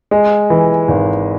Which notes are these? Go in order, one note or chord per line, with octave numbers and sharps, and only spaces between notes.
G#3
E3
G#1